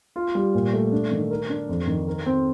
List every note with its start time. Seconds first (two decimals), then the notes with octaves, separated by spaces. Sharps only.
0.16 F4
0.35 G3
0.54 A#2
0.73 A3
0.92 D4
1.11 D#3
1.31 A#4
1.49 D4
1.69 F2
1.87 D#3
2.08 A#4
2.26 C4